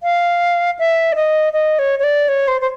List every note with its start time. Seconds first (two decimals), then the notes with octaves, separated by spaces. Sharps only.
0.03 F5
0.79 E5
1.12 D5
1.15 D#5
1.53 D#5
1.79 C#5
1.99 C#5
2.04 D5
2.28 C#5
2.48 C5
2.61 C5